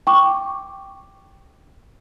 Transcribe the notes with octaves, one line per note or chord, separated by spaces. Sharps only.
G5 C#6 D6